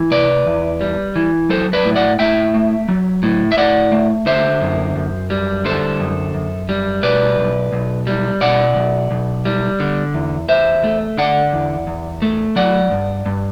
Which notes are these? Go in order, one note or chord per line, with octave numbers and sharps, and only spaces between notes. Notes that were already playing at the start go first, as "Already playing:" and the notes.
Already playing: E3
C3 B4 D5
E2
G3
E3
F#3 A4 C5
B4 D5
A2
D5 F#5
A2 E5 G5
A3
F#3
A2
E5
A2 D5 F#5
A3
D3 C5 E5
F#2
F#2
G3
D3 A4 C5
F#2
F#2
G3
B2 B4 D5
B1
B1
G3
B2 D5 F#5
B1
B1
G3
D3
E2
E2 C5 E5
A3
D3 D5 F#5
E2
E2
A3
F#3 D5 F#5
G2
G2